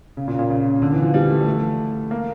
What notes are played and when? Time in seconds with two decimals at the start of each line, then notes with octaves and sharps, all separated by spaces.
0.17 C#3
0.28 A#2
0.39 A#2
0.50 C#3
0.82 D3
0.92 E3
1.03 F3
1.14 G3
1.31 A3
1.46 A3
2.11 A#3